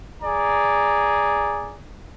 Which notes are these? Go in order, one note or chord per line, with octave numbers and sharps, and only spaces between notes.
G#4 D5 A#5